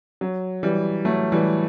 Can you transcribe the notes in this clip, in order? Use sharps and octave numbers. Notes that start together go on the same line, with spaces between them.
F#3
E3 G3
F#3 A3
E3 G3